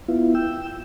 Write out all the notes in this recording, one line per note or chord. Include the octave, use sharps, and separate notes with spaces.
B3 E4 F4
G5 E6